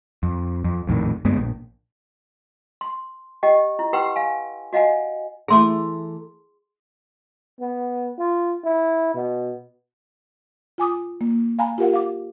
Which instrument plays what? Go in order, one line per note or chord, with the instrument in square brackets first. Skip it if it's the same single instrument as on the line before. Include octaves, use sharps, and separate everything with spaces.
[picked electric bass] F2
F2
A#1 F2 A2 D#3
D2 G2 G#3 B3
A#1
[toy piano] C6
G4 D#5 G5
E4
G4 B4 F#5 G5 C6 E6
F5 G#5
F#4 D#5 F5 F#5 G#5
[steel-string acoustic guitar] E3 A3 A#5 [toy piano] G#4 C6 D6
[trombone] B3
F4
E4
B2
[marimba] F4 G#5 D6 D#6
A#3
F5 G#5 A#5 B5
F4 G4 A#4 F5 F#5
F5 D6